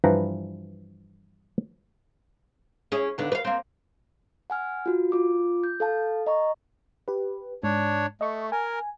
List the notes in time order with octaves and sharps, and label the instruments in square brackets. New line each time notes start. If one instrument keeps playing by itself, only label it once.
[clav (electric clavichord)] G2 E3 F3 B4 G5 A#5
[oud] C#4 E4 G#4
D#2 D3 B3
B4 F5
A#3 C4
[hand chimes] F#5 G#5 F6
F4 F#4
F4 D6
G6
A4 F5 A5
D#5 A#5 C#6
[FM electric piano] G4 B4
[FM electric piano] G#2 [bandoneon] D4 C#5
[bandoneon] A3 [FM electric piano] D#5 C#6
[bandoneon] A#4 [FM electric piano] G#5